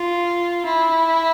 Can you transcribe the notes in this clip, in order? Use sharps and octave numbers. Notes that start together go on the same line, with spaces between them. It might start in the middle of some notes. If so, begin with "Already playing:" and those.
Already playing: F4
E4